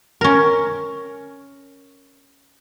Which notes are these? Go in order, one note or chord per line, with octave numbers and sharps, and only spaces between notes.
C#4 A#4